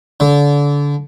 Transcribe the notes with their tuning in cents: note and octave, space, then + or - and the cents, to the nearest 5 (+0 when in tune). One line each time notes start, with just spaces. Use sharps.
D3 -30